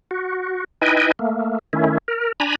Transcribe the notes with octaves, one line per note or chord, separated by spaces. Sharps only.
F#4
D#4 E4 B4 D#5 G5 G#5
A3 A#3
D#3 A3 C#4 E4
A#4
D4 G#5 A#5 B5